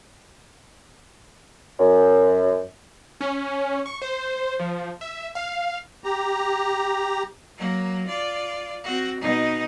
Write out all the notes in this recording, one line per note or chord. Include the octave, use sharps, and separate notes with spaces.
F#2
C#4
C#6
C5
F3
E5
F5
G4 A#5
F#3 A#3
F4 D5
C4 F#4
B2 D#4